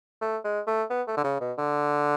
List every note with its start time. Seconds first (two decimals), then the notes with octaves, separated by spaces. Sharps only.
0.21 A3
0.44 G#3
0.67 A3
0.90 B3
1.07 A3
1.17 D3
1.24 C#3
1.40 B2
1.58 D3